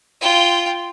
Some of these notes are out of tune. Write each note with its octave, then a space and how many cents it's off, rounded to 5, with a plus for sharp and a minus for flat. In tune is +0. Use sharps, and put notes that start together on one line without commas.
F4 -10 G5 +0